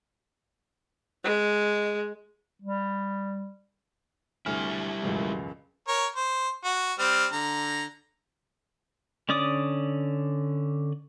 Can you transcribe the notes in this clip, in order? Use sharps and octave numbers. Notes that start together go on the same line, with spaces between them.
G#3
G3
D2 G3 E4 G#5 F6
E1 C#2 F#2
A#4 C#5
C5
F#4
G3 C4 F6
D3 A#5
D3 C#4 D5 D6 D#6